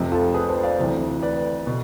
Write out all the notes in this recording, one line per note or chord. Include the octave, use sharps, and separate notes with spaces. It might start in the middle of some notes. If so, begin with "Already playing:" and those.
Already playing: F1 F2 C3 F3
F4 A4
G#4 B4
A4 C5
D5 F5
D2 C3 E3
B4 D5
B2